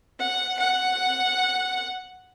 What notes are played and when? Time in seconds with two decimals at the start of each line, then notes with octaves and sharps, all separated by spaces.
0.19 F#5
0.59 F#5